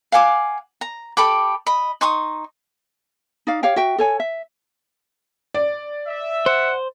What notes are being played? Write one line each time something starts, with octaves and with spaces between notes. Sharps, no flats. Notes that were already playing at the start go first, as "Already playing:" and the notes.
F5 F#5 G#5 D6
A#5
G4 A4 B5 D6
D#5 B5
D#4 C6 C#6 D#6
D#4 D5 F5
G4 C#5 F5 G5
F#4 E5 G5
A4 C#5 G#5
E5
D5
E5
C5 F#5